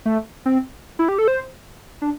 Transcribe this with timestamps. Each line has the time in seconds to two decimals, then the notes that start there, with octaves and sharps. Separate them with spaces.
0.06 A3
0.46 C4
0.99 E4
1.08 G4
1.18 A4
1.28 C5
2.02 D4